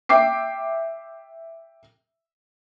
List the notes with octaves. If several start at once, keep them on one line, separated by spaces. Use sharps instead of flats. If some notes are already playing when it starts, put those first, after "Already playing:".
E5 G5 D6 C7